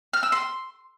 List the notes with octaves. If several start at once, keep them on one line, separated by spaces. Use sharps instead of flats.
F6
E6
C6